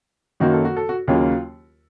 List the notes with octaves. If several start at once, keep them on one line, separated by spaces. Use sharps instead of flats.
F#2 D#3 F#3 A#3 F#4
A4
F#4
A4
F#4
D#2 C#3 F#3 A#3 C#4 F4